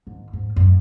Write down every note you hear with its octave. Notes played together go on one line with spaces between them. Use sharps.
G#1
G#2
F#2